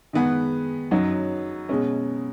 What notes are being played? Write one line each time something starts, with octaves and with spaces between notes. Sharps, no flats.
D#3 G#3 B3 G#4 B4
F#2 F#3 D#4 F#4
B2 G#3 C#4